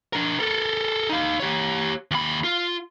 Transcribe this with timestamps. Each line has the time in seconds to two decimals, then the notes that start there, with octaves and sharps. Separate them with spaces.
0.13 D4 A#4
0.39 A4 A#4
1.09 D#4 F5
1.40 G4 C#5
2.11 D#2 B5
2.44 F4